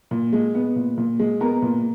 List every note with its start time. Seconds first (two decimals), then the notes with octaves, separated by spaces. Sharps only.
0.11 A#2
0.33 G#3
0.54 B3
0.76 A#2
0.97 A#2
1.19 G#3
1.40 B3 A#4 A#5
1.62 A#2